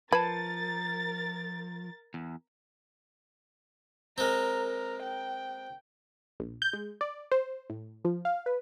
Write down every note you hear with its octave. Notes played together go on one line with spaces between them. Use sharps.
F3 A#4 B4 A5 G#6 A6
E2
G#3 C4 A#4
A#4
G5
A#1
G6
G#3
D5
C5
A2
F3
F5
B4